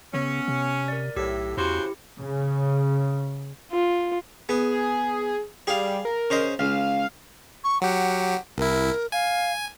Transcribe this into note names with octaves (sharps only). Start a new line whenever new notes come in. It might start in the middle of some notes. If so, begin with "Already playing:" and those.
C#3 B3 C#4
C3
A#4 D5
B1 A2 G4 E6 B6
E2 C#3 E4 F#4 G4 C5 C#7
C#3
F4
B3 G#4
G3 G#4 F5
A#4
C#3 C5 D#5
C#2 F5
C#6
F#3 G4 F#5
C2 E4 A#4
F5 G#5